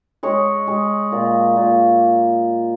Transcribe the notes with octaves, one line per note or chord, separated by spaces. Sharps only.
G#3 C#5
G#3
A#2
A#2